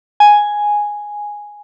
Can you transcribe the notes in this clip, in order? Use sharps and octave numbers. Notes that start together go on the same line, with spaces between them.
G#5